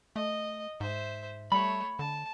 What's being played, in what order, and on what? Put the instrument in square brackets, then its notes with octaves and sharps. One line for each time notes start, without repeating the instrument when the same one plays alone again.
[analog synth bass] A3 [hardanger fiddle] D#5
[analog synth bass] G#2 [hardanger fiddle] C5 E5
[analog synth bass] G3 [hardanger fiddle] A3 C#5 [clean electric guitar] B5
[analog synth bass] D3 [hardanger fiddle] A5